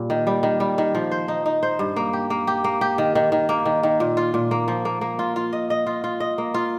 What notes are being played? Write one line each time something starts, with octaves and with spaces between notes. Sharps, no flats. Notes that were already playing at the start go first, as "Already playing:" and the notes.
Already playing: A#2 G3
D#3
G3
D#3
G3
D#3
F3
C5
D#4
D#4
C5
G2
A#3
G4
A#3
G4
A#3
G4
D#3
D#3
D#3
A#3
D#3
D#3
A#2
F4
A#2
A#3
F3
A#3
A#3
F4
F4
D#5
D#5
F4
F4
D#5
A#3
F4